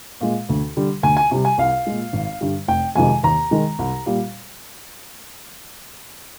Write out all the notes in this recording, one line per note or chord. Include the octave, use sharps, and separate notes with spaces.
A#2 G#3
D2
D3 G3
D2 G#5
G#5
C3 G3
G#5
C2 F5
A#2 G#3
G#1
G2 D3 G3
F1 G5
F2 C3 D#3 G#3 G#5
D#2 A#5
D#3 G#3
C2
A#2 G3